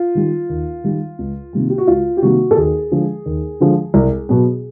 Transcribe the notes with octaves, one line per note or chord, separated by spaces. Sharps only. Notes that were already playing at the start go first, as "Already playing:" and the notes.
Already playing: F4
D#3 G3
D#2
D#3 G3
C#2
C3 D#3 G3 A#3
G4
F#4
C#2 F4
G4
C3 D#3 G3 A#3 F#4
A4
D#2 G#4
D3 F3 G#3
D#2
D3 F3 G#3
C2
B2 F#3 B3